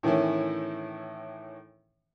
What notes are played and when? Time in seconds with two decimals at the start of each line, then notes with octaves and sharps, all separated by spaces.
0.03 A2 D#3 E3 C#4 E4